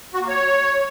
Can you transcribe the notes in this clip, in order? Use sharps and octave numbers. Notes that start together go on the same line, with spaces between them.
F#4
A#3
C#5